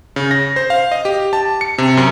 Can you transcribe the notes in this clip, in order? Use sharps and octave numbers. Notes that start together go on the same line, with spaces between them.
C#3
A#6
C5
F5
D#5
G4
A5
C#7
C3
F#2